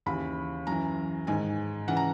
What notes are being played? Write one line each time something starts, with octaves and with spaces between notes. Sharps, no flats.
D#2 C#3 E3 B5
F#2 E3 A#5
G#2 D#3 G#5
C#3 E3 F#5
A#5